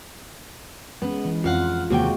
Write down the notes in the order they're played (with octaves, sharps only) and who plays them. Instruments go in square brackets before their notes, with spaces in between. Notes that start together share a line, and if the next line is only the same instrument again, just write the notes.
[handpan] G#3 C#4 [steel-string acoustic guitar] B3
[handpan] E3
[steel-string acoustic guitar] F2 F5 F#5 [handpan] F4
[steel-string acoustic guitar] D#2 C3 G5 [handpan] G#3 A#3 F#4